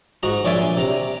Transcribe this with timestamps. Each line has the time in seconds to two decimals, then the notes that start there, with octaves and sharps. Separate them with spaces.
0.23 G#2 F#4 A#5
0.45 A#1 C#5 D5 E5 G#5 C6
0.77 C3 A#5